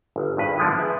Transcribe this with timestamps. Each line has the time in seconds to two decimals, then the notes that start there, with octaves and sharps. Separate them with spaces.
0.16 G1
0.37 G#1 G2 B4
0.57 D3 F3 G#3 B3 D4 E4
0.79 G#4 B4 E5 G#5